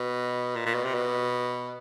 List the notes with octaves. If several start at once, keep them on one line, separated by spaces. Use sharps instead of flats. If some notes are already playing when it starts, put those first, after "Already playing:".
Already playing: B2
A#2
A#2
B2
C3
B2